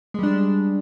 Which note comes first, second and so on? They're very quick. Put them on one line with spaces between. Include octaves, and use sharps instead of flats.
G#3 G3 D4